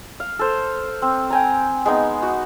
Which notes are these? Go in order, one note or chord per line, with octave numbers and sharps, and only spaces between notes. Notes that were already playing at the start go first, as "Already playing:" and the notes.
F5
A4 C5
C4
G5 G#5 A#5
G#3 B3 D#4
F#4